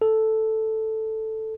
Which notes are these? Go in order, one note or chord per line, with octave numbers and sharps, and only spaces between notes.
A4